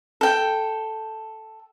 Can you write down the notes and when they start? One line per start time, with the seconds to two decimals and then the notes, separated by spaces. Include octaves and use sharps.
0.21 A4 G5